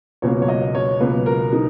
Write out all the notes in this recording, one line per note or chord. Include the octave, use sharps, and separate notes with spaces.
C#2 B2 F#3 A#3 C#5
C#5
D#5
C#5
C#2 B2 F#3 A#3 B4
A#4
D#4